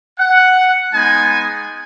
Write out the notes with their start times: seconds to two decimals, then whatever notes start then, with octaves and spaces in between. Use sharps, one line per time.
0.19 F#5
0.93 G#3 B3 D#4 G#5